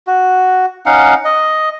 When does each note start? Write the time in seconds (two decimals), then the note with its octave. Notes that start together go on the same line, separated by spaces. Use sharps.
0.07 F#4
0.86 C#4 D#4 F5 F#5
1.25 D#5